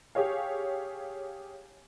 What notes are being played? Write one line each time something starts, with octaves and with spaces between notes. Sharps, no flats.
G4 G#4 C#5 F5